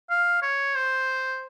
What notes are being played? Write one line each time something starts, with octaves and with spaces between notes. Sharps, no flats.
F5
C#5
C5